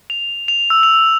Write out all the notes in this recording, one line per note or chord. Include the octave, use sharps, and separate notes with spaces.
F7
F7
E6
F7